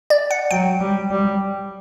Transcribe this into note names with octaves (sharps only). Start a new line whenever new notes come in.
D5
F#5
F#3 G5
G3
G3